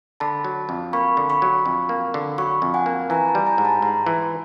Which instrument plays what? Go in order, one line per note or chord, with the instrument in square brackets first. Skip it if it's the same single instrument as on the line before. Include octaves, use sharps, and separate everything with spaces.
[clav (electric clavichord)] D3 [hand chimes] A5 B5
[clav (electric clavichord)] F#3
F2
[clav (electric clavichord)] A#3 [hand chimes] B5 C#6
[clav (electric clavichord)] D3
[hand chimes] B5 C#6
[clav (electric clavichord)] F#3
F2
A#3
D3
[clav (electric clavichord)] F#3 [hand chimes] B5 C#6
[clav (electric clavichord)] F2
[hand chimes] F#5 G#5
[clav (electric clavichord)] A#3
[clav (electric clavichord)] E3 [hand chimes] G#5 A#5
[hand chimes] A5 B5
[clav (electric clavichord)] G3
[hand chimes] G#5 A#5
[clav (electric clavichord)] G#2
[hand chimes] A5 B5
[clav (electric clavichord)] G#2 [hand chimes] A#5 C6
[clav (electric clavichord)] E3